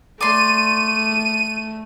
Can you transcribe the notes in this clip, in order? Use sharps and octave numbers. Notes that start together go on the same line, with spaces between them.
A3 D5 C6 D#7